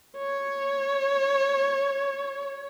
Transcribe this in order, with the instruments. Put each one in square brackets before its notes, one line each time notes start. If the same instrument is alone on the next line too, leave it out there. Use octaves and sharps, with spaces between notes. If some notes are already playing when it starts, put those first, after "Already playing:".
[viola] C#5